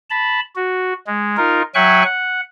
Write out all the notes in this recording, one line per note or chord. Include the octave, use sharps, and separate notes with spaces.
A5 B5
F#4
G#3
D#4 F4 A#4
F#3 E5 G5 G#5 C#6 F#6
F#5